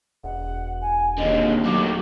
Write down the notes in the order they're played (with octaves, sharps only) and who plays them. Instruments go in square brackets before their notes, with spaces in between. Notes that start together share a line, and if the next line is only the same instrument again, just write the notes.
[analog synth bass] E1 [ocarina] F#5
[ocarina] G#5
[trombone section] D#2 [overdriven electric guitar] A#2 D3 [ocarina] D#5
[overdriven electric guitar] F#3 A3 [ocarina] D6